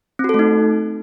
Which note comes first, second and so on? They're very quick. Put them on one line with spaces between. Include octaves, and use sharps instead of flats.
C4 F#4 A4 A3 D#4